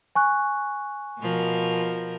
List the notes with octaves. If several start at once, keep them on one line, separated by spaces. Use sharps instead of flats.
G#5 C#6 F#6
B2 F3 A#4